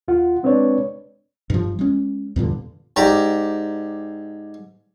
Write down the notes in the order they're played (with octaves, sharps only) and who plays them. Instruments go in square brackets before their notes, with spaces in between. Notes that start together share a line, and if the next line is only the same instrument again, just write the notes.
[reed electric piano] D#2 F4 F#5
G#3 C4 D4 B4 C#5 D5
[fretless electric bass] G2 F3
G#3 C#4
E2 G2 A#2 D3
[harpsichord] G#2 G4 D5 A#5